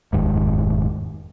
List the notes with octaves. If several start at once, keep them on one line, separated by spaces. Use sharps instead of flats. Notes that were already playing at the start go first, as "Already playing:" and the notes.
F1 D#2 G#2